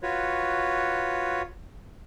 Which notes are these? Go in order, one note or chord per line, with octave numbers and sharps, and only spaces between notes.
F4 F#4 B4 C#5